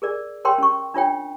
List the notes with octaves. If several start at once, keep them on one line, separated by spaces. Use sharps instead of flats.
G#4 A#4 D5
A#4 C#5 G5 C6
C#4 C#6
D4 F4 C#5 G5